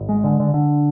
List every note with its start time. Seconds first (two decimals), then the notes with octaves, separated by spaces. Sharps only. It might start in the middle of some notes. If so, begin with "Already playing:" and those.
Already playing: G#1
0.09 G#3
0.24 D3
0.40 D3
0.54 D3